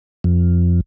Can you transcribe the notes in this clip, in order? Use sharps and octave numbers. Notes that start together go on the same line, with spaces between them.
F2